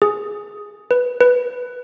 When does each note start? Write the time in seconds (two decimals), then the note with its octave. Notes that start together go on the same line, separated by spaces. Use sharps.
0.02 G#4
0.91 B4
1.21 B4